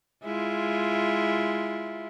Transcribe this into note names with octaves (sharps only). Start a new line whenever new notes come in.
G#3 E4 F4